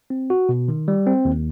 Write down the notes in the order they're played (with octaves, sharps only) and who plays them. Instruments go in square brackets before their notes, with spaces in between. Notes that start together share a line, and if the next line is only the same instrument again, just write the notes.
[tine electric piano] C4
F#4
B2
D#3
G3
C4
D#2